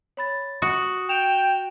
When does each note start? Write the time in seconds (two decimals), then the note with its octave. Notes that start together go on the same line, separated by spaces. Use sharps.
0.17 C#5 B5 A6
0.62 F#4 D#6
1.09 G5 E7 F7